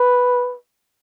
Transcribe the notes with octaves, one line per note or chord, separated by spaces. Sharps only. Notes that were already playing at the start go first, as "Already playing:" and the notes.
Already playing: B4